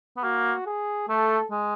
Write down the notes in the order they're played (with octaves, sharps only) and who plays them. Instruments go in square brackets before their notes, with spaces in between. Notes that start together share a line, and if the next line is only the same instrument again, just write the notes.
[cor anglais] B3
[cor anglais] A#3 [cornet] F#4
[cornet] G#4
[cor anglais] A3 [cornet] A4
[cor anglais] G#3